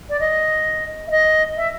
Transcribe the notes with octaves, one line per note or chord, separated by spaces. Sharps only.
D5
D#5
E5
D#5
E5